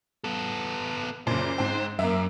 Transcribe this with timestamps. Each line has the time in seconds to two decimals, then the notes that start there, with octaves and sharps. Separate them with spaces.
0.24 B3 A4
1.27 F#1 A#2 C5
1.58 G#2 C4
1.99 F#2 A#3 E5